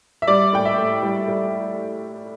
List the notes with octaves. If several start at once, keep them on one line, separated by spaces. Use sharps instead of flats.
E5
G3 D5
A2 G5
E5
A2
G3
G3